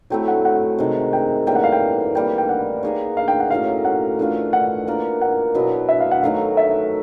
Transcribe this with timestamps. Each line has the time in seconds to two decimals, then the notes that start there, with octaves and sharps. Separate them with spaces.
0.10 F#3 A3 C4 E4 G5
0.28 F#5
0.45 F#5
0.78 C3 D#3 G#3
1.13 G5
1.47 A2 E3 G3 A#3 G5
1.55 F#5
1.64 F5
1.72 G5
2.15 E3 G3 A#3 G5
2.38 G5
2.49 F#5
2.83 A#3 D#4 G#4 C#5
3.17 F5
3.28 G5
3.40 F#5
3.50 A2 F#3 A#3 C#4 F5
3.85 F#5
4.19 E3 A3 D4 F4
4.53 F#5
4.87 A#3 D4 F4 A#4
5.21 F#5
5.54 B2 F#3 B3 E4
5.89 E5
6.00 F5
6.11 F#5
6.23 D#3 F#3 A3 F5
6.57 E5